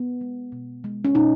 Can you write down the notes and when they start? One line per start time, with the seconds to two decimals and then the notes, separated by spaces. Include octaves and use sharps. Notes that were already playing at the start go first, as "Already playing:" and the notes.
Already playing: B3
0.21 G#3
0.52 B2
0.84 G#3
1.05 C#4
1.15 B2 D#4